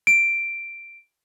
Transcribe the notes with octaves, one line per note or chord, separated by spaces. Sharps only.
D7